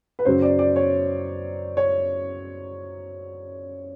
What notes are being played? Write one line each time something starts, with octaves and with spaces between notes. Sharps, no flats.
B4
F#2 C#3 F#3 C5
D5
D5
C#5
C#5